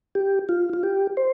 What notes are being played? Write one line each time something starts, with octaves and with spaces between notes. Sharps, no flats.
G4
F4
F4
G4
C5